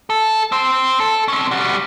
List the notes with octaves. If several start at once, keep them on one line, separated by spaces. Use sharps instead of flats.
A4
C4 C5
A4
C4 C#4
G3 F#4